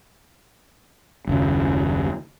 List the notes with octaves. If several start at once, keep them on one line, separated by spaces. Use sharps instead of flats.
F#1 D#2 C#3